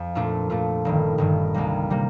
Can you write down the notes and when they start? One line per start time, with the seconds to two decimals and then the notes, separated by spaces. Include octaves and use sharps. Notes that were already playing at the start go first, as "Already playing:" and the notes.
Already playing: F2
0.15 A#2 A3 D4 F4
0.50 A#2 A3 D4 F4
0.85 G1 G2 D#3
1.18 G1 G2 D#3
1.54 C2 C3 G3 A#3
1.90 C3 G3 A#3